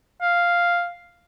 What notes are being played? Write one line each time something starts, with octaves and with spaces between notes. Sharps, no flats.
F5